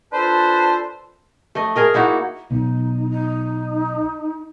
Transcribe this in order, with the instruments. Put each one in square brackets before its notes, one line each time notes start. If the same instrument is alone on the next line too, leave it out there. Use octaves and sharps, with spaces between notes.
[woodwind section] D4 F4 A4 B4 C5 A5
[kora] A3 D#5
G#4 A#4 D#5
A#3 D#4 E4 F#4
[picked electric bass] B1 [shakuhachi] D#4
[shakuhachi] D#4